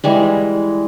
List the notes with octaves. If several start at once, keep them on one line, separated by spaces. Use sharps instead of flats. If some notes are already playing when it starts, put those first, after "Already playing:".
E3 G3 G#3